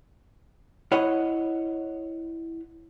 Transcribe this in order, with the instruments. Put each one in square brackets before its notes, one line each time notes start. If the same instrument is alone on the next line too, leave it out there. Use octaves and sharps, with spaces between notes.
[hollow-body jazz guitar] E4 C#5 D#5 F#5 B5